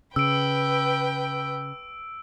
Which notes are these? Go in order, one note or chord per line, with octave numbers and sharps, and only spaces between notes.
C#3 B4 G5 E6 D7